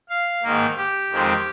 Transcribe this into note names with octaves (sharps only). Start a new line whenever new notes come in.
F5
G#2 D#3 A#3
G4
F2 D#3 G#3 C4